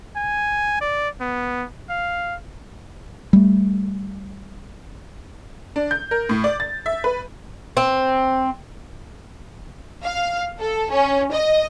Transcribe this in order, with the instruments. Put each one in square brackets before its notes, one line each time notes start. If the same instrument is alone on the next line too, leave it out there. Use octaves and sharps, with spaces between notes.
[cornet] G#5
D5
B3
F5
[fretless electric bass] G3 A3
[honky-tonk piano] D4
G6
A#4
A2
D5
A6
E5
B4
[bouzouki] C4
[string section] F5
A4
C#4
D#5